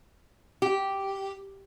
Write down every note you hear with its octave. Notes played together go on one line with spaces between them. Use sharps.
G4